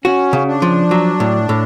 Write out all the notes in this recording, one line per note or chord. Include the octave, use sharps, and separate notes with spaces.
C#4 F#4
C#3
D4
F3
F#3
A2
A2